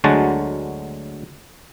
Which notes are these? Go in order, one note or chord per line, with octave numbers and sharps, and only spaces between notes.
D2 D3 F#3 G#3 F#4 A5